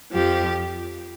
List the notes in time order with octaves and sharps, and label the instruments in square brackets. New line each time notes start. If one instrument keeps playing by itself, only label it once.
[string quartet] F2 F3 G4